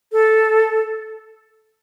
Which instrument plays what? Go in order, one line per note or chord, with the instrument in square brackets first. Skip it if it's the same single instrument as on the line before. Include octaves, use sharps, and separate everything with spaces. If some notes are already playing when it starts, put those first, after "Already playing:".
[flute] A4